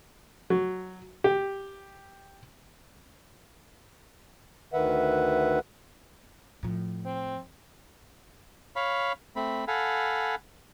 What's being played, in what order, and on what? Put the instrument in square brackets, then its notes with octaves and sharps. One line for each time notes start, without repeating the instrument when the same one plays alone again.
[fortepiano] F#3
G4
[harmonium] D2 D#3 B4 E5 F#5
[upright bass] A2 F3
[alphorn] C4
[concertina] C#5 F5 B5
A3 C4 B5
A4 F5 F#5 G#5 B5